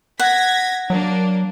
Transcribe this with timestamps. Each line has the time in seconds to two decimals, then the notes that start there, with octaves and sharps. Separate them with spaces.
0.20 F#5 G#6 A#6 B6
0.90 F#3 A#3 D4